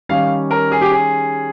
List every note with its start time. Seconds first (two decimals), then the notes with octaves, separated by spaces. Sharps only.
0.09 D#3 G3 C#4 F5
0.51 A#4
0.72 G#4
0.81 G4
0.92 G#4